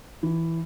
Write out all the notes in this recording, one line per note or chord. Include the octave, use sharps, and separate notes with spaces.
E3